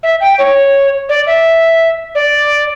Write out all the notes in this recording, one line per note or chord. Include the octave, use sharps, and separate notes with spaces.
E5
G5
C#5
D5
E5
D5